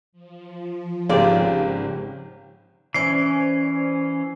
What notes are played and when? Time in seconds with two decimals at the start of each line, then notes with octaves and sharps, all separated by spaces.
0.12 F3
1.09 G#1 C#3 G4 D5
2.94 E3 C#4 C5 D5 C7